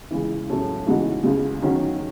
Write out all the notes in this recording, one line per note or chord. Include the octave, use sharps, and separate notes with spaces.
C#2 C#3 E3
A2 F#3 A3 C#4 G#4
C#3 E3 G#3 D#4 F#4
C#2 C#3 G#3
D#3 F#3 C#4 F#4